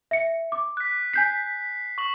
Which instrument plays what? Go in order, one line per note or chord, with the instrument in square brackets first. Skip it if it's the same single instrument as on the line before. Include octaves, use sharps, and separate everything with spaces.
[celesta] E5 C#7
D6
[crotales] F#6 B6
[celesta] G#5 G6 B6 [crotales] C7
[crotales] C#6 F#7